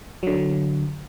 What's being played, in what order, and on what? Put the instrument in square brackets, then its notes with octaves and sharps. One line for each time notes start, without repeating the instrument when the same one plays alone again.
[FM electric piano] D3 F#3